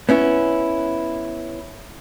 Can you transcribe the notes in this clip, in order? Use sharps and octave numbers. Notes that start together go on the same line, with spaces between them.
B3 C#4 E4